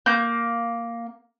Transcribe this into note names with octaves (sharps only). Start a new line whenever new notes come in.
A#3 G6